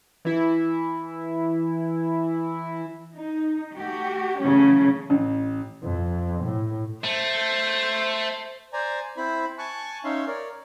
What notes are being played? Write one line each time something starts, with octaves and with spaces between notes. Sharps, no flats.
E3 E4
D#4
A3 F#4 G4
C#3 E3 F#3 A3 C#4
A1
F2
A2
A3 C5
C5 D5 G#5 A#5
C4 E4 C5 B5
G#5 A5 C#6 F#6
C#4 D#4 C#5 E5 F5 C6
A#4 C#5 D5